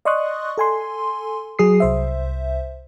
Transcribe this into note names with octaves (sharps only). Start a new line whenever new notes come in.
D5 D#5 C6 C#6 D#6 F#6
A4 G#5 C6
F#3 G#4 D#6 C7
C2 C5 E5